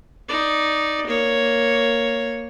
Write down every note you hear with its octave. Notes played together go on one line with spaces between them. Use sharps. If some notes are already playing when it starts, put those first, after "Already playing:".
D#4 D5
A#3 C#5